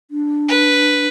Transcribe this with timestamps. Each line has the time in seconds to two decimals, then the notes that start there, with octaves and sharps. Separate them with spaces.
0.11 D4
0.49 B4